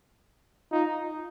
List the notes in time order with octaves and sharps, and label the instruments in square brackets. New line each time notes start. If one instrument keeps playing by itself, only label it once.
[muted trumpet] D#4 [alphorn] F4